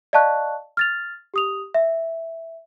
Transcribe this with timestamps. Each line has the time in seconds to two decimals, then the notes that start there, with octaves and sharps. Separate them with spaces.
0.13 D5 D#5 F5 A5 C#6 F#6
0.77 F6 A6 F7
1.34 G4 D#6 F7
1.74 E5